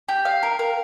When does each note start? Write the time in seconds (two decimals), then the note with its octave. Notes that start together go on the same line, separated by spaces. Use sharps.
0.09 G4
0.25 F5
0.43 A#4
0.59 A#4